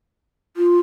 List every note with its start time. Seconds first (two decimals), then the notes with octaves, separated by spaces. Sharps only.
0.57 F4